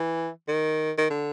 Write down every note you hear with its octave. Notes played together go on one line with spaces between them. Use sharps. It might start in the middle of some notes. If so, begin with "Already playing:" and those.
Already playing: E3
D#3
D#3
D3